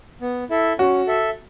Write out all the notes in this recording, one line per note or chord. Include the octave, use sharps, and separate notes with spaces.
B3
E4 A4 E5
C#4 F#4
A4 E5